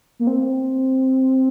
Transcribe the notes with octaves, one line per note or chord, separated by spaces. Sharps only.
A#3
C4